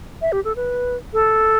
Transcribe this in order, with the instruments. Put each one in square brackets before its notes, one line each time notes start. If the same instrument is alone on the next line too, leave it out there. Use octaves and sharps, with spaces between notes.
[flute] E5
G4
A4
B4
A4